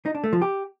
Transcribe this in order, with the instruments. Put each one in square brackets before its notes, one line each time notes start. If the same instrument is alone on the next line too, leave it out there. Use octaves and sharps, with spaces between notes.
[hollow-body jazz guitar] D#4
D4
A3
F3
G4